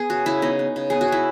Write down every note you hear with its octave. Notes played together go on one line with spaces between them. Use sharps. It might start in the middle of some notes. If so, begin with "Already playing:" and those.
Already playing: B3 G#4
C#3 F#4
C#3 E4
B3 D#4
B3
C#3
B3 G#4
F#4
C#3 E4